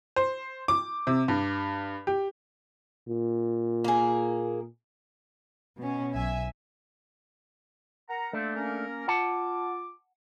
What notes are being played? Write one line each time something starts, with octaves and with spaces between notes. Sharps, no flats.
C5
D6
C3
G2
G4
A#2
A#3 G#4
B2 C#4
B1 E5 G#5
A#4 F#5 A#5
A3 A#3 C4 D4
A#3 C#4 A#4
F4 F#5 A5 D6